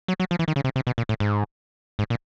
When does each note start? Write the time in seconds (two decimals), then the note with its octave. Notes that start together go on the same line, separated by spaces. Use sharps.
0.08 F#3
0.20 F#3
0.31 F3
0.39 E3
0.48 D#3
0.56 C#3
0.64 C3
0.76 C3
0.87 B2
0.98 A#2
1.09 A2
1.20 G#2
1.99 G#2
2.10 A#2